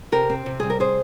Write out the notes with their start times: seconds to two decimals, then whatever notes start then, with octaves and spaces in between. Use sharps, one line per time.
0.12 C3 G4 A#4
0.30 C4
0.46 C3
0.60 G3 G#4
0.70 A#4
0.80 C3 G#4 C5